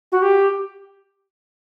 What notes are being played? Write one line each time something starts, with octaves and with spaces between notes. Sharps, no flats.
F#4
G4